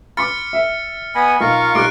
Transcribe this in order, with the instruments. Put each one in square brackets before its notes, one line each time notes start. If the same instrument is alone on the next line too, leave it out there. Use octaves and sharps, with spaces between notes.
[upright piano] B5 C6 D6 [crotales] F6 A6 C#7
[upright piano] E5
[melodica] B3 G#5 B5 [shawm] D#5
[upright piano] B1 [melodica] F4 A#4 C#6 [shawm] F5
[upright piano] B1 G3 D6 [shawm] C6 [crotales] F#6 D7